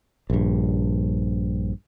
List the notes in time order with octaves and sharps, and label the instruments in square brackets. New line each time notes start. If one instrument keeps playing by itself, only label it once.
[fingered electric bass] A#1 G2